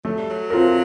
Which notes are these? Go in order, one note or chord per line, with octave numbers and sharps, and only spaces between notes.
F#3 A3
G3
F#3
C4 F4 A#4